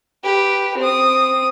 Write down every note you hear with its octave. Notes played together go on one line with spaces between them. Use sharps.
G4 B4
C4 D#6